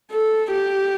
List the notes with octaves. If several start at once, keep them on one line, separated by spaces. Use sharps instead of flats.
A4
G4